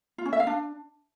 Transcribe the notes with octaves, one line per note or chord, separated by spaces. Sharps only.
F4
C#4
E5
F5
D4